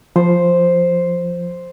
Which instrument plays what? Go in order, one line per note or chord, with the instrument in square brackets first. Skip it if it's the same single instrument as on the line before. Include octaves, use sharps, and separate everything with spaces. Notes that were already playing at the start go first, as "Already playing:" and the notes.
[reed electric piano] F3 [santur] C5